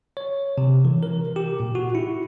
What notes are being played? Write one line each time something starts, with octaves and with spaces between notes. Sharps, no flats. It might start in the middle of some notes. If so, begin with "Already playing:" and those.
C#5
C3
E3
A#4
G4
A#2
F#4
E4